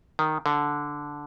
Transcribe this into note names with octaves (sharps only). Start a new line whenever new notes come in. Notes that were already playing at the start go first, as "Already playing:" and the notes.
D#3
D3